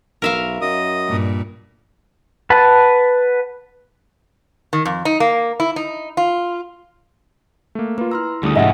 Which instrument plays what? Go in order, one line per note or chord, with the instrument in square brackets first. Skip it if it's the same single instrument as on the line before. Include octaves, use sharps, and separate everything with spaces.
[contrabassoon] B1 [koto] A#4 E5 F5
[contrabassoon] F#2 [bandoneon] D#5 D#6
[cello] G2 A#2
[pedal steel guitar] B4 F#5 A5
[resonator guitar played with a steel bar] D#3
F2
D#4
A#3
E4
D#4
F4
[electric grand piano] A3 A#3
[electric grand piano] A#3 F4 [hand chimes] B4
[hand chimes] E4 C6 E6 [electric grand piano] A#5 F6
[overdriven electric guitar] D2 [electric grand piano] G3 A3 D#6 [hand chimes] C#4 E4 G#4
[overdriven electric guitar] C2 G#2 [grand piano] D#5 E5 F#5 [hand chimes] G#5 A6